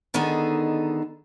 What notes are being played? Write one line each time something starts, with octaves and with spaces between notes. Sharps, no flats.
D3 D#3 B3 D#4 G#4 A4